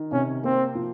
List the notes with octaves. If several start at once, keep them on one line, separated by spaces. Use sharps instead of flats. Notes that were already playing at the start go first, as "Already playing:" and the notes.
Already playing: D#3
C3 C#4
A#3 C4
F3